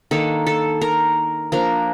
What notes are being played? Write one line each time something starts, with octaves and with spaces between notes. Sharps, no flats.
D#3 A#3 D4 A4
A4
A#4
F3 A#3 D4 A#4